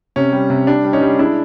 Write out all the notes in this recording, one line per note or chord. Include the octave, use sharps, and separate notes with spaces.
C3 C#4
G3
C3
G3 D4
G3
C#4 D#4
G3
G#3 D4 E4